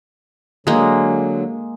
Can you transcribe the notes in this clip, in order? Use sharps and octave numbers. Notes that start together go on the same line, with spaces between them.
D3 F#3 G#3 A#3